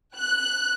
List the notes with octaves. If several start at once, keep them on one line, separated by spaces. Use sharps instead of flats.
F#6